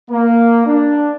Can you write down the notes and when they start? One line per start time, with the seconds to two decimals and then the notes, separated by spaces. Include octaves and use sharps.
0.10 A#3
0.66 D4